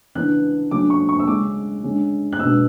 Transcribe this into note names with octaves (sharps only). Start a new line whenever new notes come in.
C#3 E3 B3 D4 F#6
D3 F#3 A3 C#4 D6
C#6
C#6
E6
C#3 G#3 C#4 D6
D3 G#3 C#4
F#6
B2 G#3 B3 D4 E6